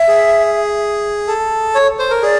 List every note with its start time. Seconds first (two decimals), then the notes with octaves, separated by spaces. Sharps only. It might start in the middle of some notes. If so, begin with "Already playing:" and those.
Already playing: E5
0.08 G#4
1.27 A4
1.75 C#5
1.99 C5
2.11 A#4
2.22 G#4 D5